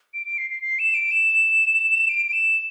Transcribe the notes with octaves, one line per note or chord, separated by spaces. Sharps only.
D7
D7
C7
C7
C7
E7
D7
E7
D7
D7
E7